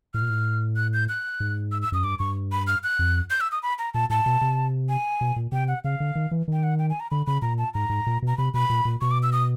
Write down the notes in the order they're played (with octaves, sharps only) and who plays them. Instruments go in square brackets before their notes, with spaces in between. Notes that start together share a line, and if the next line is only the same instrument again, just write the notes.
[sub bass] A2 [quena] F6
[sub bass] A#2
A2
[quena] F#6
G6
F#6
[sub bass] G#2
[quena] E6
E6
[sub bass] F#2 [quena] D#6
[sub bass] G2 [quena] D6
[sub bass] G2 [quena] C#6
[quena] B5
F6
F#6
[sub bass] F2
[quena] G6
E6
D#6
B5
A#5
[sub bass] A#2 [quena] A5
[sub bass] A2 [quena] A5
[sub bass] B2
C3
[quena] G#5
[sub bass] B2
A#2
[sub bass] C3 [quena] G5
[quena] F#5
[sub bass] C#3 [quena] F5
[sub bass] D3
D#3
E3
[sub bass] D#3 [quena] G5
[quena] F#5
G5
G#5
A#5
[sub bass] D3 [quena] B5
[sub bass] C#3 [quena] B5
[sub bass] A#2 [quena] A#5
[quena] A5
[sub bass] G#2 [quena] A#5
[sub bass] G#2
A#2
[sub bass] B2 [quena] A#5
[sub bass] C3 [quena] B5
[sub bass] B2 [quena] B5
[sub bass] A#2
A#2
[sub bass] B2 [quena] C#6
[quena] D6
E6
D#6